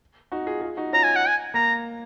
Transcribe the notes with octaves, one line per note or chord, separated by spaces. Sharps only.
D#4 F#4
F4 G#4
F4 G#4
D#4 F#4
C#4 F4 A#5
G#5
F#5
G#5
A#3 A#5